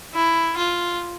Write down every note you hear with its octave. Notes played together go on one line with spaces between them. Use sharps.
E4
F4